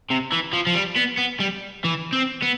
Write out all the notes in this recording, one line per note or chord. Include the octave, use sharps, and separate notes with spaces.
C3
E3
F3
F3
G3
B3
B3
G3
E3
C4
B3